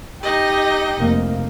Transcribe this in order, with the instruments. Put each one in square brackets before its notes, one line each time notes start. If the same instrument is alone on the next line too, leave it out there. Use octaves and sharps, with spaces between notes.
[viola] D#4 D#5 [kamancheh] G4
[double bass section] F1 A#3